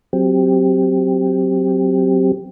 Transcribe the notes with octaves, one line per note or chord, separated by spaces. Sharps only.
F#3 C4 G4